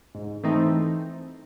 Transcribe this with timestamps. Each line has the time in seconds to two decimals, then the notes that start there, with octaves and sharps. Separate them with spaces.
0.15 G#2
0.44 E3 A3 C4 D#4